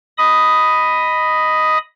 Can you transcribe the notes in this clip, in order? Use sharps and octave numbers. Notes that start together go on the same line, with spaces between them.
D#5 B5 D#6